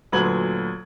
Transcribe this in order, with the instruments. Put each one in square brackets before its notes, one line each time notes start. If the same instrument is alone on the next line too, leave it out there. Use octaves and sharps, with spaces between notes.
[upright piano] D2 A#2 F#3 B4 G#6 F#7